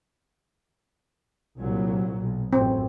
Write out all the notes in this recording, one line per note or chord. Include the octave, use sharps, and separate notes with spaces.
C2 A#2 F#3
B1
A1 F#2 C4